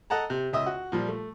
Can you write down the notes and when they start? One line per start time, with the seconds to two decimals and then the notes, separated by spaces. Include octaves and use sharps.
0.10 A4 D#5 F#5 A5 A#5
0.30 C3
0.53 C#2 D#5 E5 D#6
0.66 F#4
0.92 A#2 F3 G3
1.08 A3